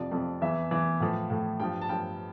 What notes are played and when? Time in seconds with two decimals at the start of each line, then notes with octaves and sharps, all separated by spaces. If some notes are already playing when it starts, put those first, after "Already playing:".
Already playing: F2 C3 F3 D5
0.11 F2 C3 F3
0.41 E2 E3 E5
0.71 E2 E3
1.00 A2 F3
1.30 A2 F3
1.60 G2 F3 G5
1.82 A5
1.89 G2 F3 G5